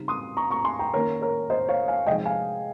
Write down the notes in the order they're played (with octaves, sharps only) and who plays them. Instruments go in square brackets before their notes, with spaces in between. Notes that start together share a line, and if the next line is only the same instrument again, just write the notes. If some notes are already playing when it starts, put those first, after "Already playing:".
Already playing: [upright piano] C#3 G3 C4 D#4
C6 D#6
A#5 C#6
A#5 C#6
G#5 C6
G5 A#5
D#3 A#3 C#4 A#4 C#5
A#4 C#5
C5 D#5
C#5 F5
F5 G#5
C3 F3 G#3 D#4 D#5 G5
F5 G#5